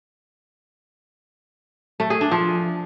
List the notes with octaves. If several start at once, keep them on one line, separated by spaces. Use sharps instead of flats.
A3
G#4
D4
F3